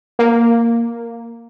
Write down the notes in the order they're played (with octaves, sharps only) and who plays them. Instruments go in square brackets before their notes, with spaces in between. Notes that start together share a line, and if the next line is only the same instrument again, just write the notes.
[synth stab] A#3